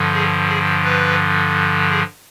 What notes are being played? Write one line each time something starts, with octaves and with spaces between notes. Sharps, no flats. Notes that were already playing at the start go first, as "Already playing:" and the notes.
Already playing: G2 D3 F3
G#4
G#4
B4
G#4